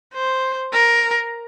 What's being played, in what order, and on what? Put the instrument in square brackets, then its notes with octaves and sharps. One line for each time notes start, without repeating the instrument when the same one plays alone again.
[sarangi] C5
A#4